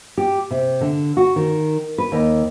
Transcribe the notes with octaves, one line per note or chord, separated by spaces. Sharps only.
G4
C3
D3
F#4
D#3
B4
D#2